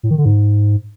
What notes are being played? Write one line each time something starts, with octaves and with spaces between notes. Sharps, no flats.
A2
D#3
D3
G#2